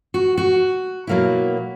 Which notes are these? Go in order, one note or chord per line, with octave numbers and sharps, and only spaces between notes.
F#4
F#4
B2 F#3 A#3 E4